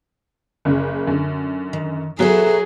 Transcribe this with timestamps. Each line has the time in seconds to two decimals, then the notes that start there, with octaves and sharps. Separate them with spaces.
0.65 F#1 C#3
1.07 F#2 D3
1.73 D#3
2.19 F#3 F#4 G#4 A4 B4 E5 A#5